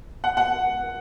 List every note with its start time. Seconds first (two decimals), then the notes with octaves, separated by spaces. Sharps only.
0.24 F#5
0.37 F#5